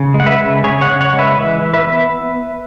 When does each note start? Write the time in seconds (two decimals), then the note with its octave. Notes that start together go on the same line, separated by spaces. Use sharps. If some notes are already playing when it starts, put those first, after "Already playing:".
Already playing: C#3
0.14 G#3
0.20 F#5
0.26 B4 E5
0.39 C#3
0.63 C#3 G#4 C#5
0.81 C#5 F#5
0.88 C#3
1.01 C#5 F#5
1.13 G#3
1.18 B4 E5
1.37 E3 B4 E5
1.62 E3
1.73 B4 E5
1.86 B3